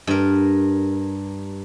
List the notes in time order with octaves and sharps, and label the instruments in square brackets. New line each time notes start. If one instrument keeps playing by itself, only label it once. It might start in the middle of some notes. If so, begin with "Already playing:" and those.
[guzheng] G2 A#4